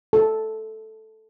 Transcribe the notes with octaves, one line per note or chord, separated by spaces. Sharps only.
A4